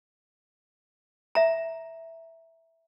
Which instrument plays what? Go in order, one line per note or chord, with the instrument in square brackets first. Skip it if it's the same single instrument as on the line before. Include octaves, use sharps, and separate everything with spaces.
[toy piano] E5 A#5